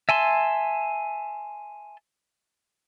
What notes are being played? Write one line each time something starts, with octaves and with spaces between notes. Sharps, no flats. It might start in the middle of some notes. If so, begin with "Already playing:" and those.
E5 G#5 A5 C6